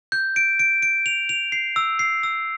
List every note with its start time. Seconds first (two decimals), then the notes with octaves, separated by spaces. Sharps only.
0.12 G6
0.36 D7
0.59 D7
0.82 D7
1.06 F7
1.29 F7
1.52 C7
1.76 E6
1.99 C7
2.23 E6